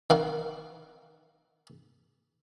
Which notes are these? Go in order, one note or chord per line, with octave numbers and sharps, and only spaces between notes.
D#3 F5 F#5 C#6